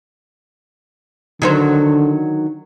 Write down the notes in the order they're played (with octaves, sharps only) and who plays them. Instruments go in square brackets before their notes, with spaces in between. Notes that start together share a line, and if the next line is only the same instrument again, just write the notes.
[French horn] D3 [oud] D#3 F#3 C5